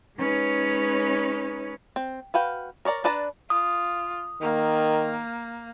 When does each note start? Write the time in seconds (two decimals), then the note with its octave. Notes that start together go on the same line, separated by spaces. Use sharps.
0.17 G#3 C#4 D#4 B4 C#5
1.96 C4
2.34 F#4 B4 F5 G5
2.85 A#4 C#5 D5 A#5
3.04 D4 B4 D5 A5 A#5
3.50 F4 D#6
4.42 D#3 A#3